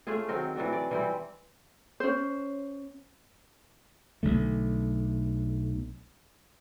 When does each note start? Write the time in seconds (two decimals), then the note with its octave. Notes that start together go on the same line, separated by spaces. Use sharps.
0.07 A3 C#4 F4 G#4
0.28 D#3 F#3 C4 A#4
0.56 E3 F#3 D4 F#4
0.73 D5
0.91 E3 G3 C4
2.00 C#4 C5
4.23 B1 D3 A3